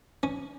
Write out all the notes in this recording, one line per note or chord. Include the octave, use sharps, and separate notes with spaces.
C#4